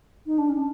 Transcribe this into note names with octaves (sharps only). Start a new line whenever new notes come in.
D#4
D4
C#4